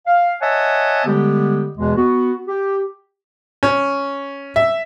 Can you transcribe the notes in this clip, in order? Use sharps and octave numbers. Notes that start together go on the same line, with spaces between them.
F5
C#5 D#5 E5 F#5 G#5 A5
D3 G3 G#3 B3 G4
E2 B2 E3 G#3
B3 F#4
G4
C#4
E5